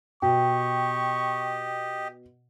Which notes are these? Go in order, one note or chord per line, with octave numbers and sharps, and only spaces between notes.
B2 G4 D#5 G5 C#6